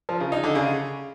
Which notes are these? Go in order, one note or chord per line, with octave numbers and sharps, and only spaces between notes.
F3
C#3
D#4
D3
C#3